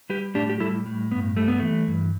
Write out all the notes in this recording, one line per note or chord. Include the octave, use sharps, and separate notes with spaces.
G3 G4 B4
A2 D4 G4
G4
G3 E4 A4
A2
G2 B3
G3 A3
B3
E3 A3
G2